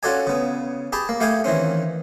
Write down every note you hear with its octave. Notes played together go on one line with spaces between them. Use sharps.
C#4 F4 F#4 A4 D5 G#5
C#3 B3
G4 G#4 A5 B5
A#3
A3 G4 F5 G5 G#5 D#6
D#3 E3 C4 C#4